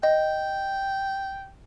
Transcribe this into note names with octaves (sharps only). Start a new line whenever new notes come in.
D#5 G5